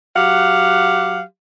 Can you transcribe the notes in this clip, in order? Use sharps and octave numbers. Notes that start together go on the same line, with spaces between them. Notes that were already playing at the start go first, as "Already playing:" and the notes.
F#3 G4 F5 F#5